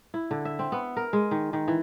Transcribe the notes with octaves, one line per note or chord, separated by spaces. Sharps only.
E4
D3
E5
C4
B3
A#4
G#3
D#3
D#3
E3